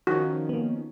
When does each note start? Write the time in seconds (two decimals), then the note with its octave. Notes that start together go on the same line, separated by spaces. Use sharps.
0.07 D#3 F3 C#4 F#4
0.49 A#3 B3